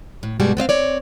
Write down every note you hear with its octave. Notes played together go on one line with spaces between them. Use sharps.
A2
G2 B2 G3 G#3 F#4
B3 C4 D#5 F5
C4 C#5 D5